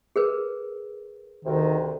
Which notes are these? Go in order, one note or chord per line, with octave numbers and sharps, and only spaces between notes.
G#4 A#4 B4
D2 C3 D#3